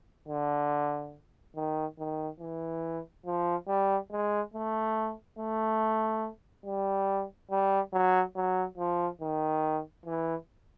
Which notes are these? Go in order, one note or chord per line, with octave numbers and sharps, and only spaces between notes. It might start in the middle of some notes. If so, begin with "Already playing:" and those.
D3
D#3
D#3
E3
F3
G3
G#3
A3
A3
G3
G3
F#3
F#3
F3
D#3
E3